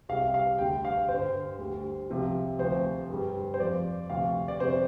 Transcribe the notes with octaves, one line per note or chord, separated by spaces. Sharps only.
C2 C3 G3 F5
F5
D2 D3 G3 G5
F5
G2 D3 G3 C5
D2 D3 G3
C2 C3 F3
D2 C3 F3 C5
G2 G3
C5
F2 F3 D5
D2 C3 F3 F5
D5
F2 C3 G3 C5